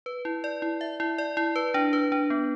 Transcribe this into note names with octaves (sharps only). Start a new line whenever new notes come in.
B4
E4
D5
E4
E5
E4
D5
E4
B4
D4
B4
D4
B3